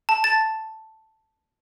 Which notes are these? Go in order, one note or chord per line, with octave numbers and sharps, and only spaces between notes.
A5
A5 A6